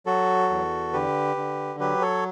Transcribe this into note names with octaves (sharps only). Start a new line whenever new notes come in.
F#3 F#4 A4
E2
D3 G4 B4
D3
F#3 G4 B4
A4 C#5